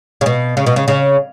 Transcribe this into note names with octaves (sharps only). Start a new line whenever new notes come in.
C#3
B2
C#3
B2
C#3
C#3